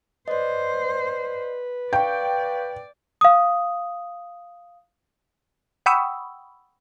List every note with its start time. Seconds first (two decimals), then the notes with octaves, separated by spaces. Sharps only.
0.28 B4 C5 D5 D#5
1.93 D5 F5 G5 C#6
3.21 F5 D#6
5.86 F#5 G5 B5 C#6 D#6 E6